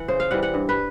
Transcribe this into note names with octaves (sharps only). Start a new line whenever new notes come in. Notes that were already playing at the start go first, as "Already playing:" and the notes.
Already playing: E3 F#5
C#3 C5
F5
E3 G3 F#5
F#5
G2
B4